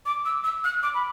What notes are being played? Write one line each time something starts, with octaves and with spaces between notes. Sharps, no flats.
D6
E6
E6
F#6
D6
B5